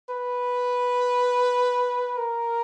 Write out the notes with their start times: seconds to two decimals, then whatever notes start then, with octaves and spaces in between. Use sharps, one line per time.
0.09 B4
2.17 A#4